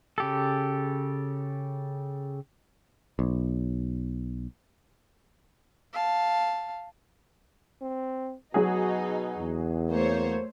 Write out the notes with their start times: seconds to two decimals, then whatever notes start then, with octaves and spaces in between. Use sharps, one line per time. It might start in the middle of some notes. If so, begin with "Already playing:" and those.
0.18 C#3 G4 A4
3.19 B1
5.93 F5 A5
7.82 C4
8.54 B2 F#3 D#4 F#4 G#4
9.39 E2
9.90 A3 A#3 C5 C#5